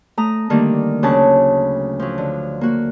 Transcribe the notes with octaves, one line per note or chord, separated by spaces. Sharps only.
A3 A#5 D#6
D3 D#3 G3 A3 A#3
D2 C#3 F#3 C#4 A5 C#6
F3 F#3
D3
A#3 F#4